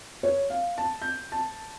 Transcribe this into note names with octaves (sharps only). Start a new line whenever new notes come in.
C#5
F5
A5
G6
A5